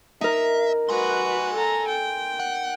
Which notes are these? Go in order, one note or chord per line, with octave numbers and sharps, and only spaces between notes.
D#4 A#4 E5
F#4 B4 G#5 C6
A4 A#5
G5
F#5